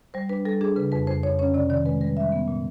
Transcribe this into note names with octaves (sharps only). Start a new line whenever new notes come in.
G3 C5
D4 B4
G3 A4
D4 G#4
C#3 B4
F2 B4
F2 C5
F2 C#5
C#4 C#5
C3 D5
D#3 D5
G#3 B4
G3 B4
G3 E5
B3
A#2